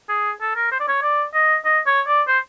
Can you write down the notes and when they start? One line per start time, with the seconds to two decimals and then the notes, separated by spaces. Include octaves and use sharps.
0.09 G#4
0.41 A4
0.56 A#4
0.72 C5
0.80 D5
0.88 C#5
1.02 D5
1.34 D#5
1.65 D#5
1.87 C#5
2.07 D5
2.28 C5